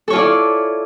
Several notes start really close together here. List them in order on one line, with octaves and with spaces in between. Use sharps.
A4 C#5 F4 E4 D5